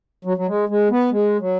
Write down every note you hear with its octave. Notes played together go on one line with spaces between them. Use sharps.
F#3
F#3
G#3
G#3
B3
G#3
F#3